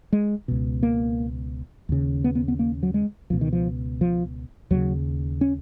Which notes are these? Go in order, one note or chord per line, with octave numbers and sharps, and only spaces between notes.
G#3
C#2 B2
A#3
D#2 C#3
B3
B3
B3
A#3
F#3
G#3
C#2 B2 F3
D#3
F3
F3
D#2 C#3 F#3
C#4